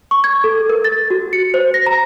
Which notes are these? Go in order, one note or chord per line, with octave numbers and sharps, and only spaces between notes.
C#6
G#6
A4
A#4
A6
F#4
C#7
C5
A#6
A#5